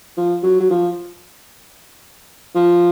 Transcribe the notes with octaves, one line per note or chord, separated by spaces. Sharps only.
F3
F#3
F#3
F3
F3